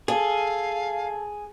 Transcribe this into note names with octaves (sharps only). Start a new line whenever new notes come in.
G#4 A4 F5